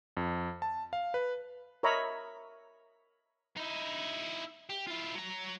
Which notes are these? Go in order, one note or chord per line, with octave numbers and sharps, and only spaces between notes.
F2
A5
F5
B4
A#4 C#5 D#5 E5 A#5 B5
D#4 E4
G4
E4 F4
F#3 A#5